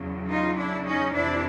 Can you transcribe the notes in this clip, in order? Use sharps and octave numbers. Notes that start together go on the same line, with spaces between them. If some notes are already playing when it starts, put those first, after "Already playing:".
Already playing: E2 C#3 F#3
D#4 F4
D4 E4
C#4 D#4
F2 C3 E3 D4 E4